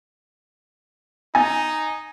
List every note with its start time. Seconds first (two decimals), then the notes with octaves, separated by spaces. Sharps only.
1.35 D#4 G#5